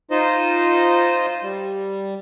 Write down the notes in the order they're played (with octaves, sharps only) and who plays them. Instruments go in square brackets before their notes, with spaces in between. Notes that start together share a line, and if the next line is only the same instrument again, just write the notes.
[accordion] D#4 F4 C5 D#5
G3